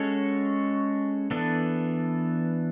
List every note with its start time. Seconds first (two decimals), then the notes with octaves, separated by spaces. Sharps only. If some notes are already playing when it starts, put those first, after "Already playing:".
Already playing: G#3 C#4 F#4 A4 C#5
1.31 E3 B3 D4 A4